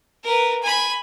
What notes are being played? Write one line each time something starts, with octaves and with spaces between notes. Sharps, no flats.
A#4 B4
G#5 B5